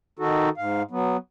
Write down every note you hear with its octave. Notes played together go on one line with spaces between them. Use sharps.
D#3 D#4 F#4 A4
G#2 F5
F#3 B3